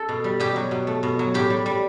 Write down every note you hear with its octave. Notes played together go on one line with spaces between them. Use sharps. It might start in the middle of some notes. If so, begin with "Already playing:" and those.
Already playing: A4
B2
G3
B2 G4
F#3
B2
A3
B2
F#3
A2 G4
G3
G3